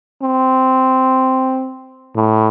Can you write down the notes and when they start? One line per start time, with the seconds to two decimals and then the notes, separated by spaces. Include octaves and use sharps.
0.22 C4
2.16 A2